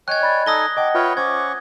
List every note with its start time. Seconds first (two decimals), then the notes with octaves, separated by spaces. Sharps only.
0.08 C#5 D#5 G5 G#5 F#6 G#6
0.21 D5 B5 A6
0.46 D#4 A4 G#5 D#6 A#6 G7
0.77 D#5 F#5 G5 A5 D6
0.95 F4 B4 C#5 E5 G5 F6
1.17 C#4 C5 F#5 C#6 D6 G#6